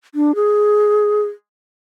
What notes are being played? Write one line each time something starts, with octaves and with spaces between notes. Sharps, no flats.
D4
G#4